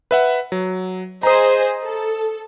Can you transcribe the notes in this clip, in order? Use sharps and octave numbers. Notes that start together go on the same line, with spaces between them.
B4 E5 F#5
F#3
G#4 C5 D#5 A#5 D#6
A4